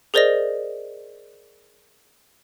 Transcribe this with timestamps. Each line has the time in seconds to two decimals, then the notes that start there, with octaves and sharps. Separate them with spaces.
0.14 G#4 A#4 C5 D5 D#5 A#6